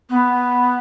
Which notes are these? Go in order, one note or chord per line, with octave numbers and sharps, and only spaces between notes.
B3